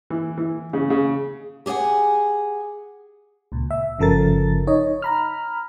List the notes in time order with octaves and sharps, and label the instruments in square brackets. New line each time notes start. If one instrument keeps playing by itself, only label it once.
[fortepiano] E3
E3
C#3
C#3
[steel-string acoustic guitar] G4 G#4 C#5 F#5 G#5
[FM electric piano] C#2 A#2
E5
G1 C#3 F3 A4 A#4 A6
D#4 C#5 D#5
A#5 B5 F6